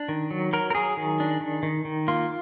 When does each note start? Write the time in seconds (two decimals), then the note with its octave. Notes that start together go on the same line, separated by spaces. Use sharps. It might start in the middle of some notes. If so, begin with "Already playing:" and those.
Already playing: D4
0.09 D#3
0.31 F#3
0.53 F#3 A#4
0.70 A#4
0.75 F#3 G#4
0.97 D#3
1.20 D4
1.41 D#3
1.63 D#3
1.85 D#3
2.08 A#3 F4